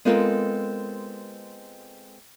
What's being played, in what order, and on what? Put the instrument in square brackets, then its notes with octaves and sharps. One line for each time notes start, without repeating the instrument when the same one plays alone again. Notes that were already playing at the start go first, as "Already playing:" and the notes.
[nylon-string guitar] G#3 B3 C4 F4 A4 A#4